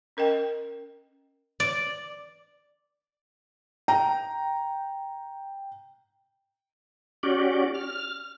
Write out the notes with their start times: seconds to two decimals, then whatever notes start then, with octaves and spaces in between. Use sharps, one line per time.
0.17 C#4 A#4 D#5 G5
1.60 D5
3.88 G5 A#5
7.23 C#4 F#4 G4 D5
7.74 F6